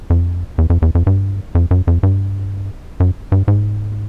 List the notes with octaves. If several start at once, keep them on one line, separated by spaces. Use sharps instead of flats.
F2
E2
F2
E2
F2
G2
F2
F#2
F2
G2
F#2
G2
G#2